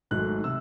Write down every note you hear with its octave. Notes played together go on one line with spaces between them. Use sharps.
G#1 G#2 F#3 A3 F#6
C3 E6